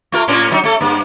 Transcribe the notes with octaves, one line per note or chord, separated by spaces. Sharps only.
A3 F4 A#4
A2 A#3 C#4
A#2 F#3 D#4
A3 A4
G2 A#3